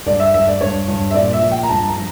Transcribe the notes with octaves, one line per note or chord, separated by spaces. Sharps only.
G2 D5
E5
G2 E5
D5
G2 C#5
G2
E5
A#2 D5
E5
F3
G5
A#5
G2 A5
A#5
F3